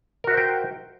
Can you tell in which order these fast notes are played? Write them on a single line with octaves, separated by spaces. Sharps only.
A#4 F#4 E5 C5 G5